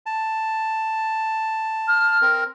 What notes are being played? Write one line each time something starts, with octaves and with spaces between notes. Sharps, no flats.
A5
F6
C4 A#4